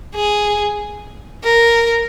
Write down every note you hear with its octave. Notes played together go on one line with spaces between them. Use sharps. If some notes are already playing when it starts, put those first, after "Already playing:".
G#4
A#4